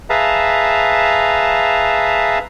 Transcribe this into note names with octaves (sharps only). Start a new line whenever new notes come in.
G#4 B4 E5 F5 A5 A#5